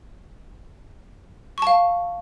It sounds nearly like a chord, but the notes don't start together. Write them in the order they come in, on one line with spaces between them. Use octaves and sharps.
C#6 A5 F5